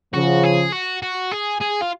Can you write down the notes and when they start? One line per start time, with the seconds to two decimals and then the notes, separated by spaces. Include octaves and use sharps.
0.14 C#3 F3 F#4
0.44 G#4
0.72 F#4
1.02 F#4
1.31 G#4
1.60 G#4
1.81 F4